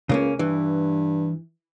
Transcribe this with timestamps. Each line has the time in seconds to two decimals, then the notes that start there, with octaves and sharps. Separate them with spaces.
0.09 C#2 C#3 A#3 C#4
0.39 G2 E3